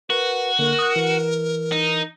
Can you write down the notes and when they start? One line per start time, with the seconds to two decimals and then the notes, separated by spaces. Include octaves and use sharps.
0.10 F#4 A#4 B4
0.59 D3 A#3 A#4
0.79 D#6 F#6
0.96 E3
1.72 D#4